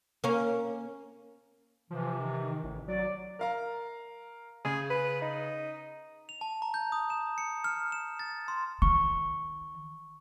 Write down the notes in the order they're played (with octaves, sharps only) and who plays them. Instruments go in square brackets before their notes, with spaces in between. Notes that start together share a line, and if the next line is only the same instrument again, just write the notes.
[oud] A#3 C#4
[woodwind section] C3 E3 [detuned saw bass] F3
[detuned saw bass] D#3
A1
[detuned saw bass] F#3 [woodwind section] D5
[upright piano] A#4 F5 A#5
[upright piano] C#3 [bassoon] G#4
[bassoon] B4
D#4
[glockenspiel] F7
A5
A#5
G6
D#6
E7
C#7
F6
E7
A6
C6
[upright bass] D#3 [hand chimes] C#6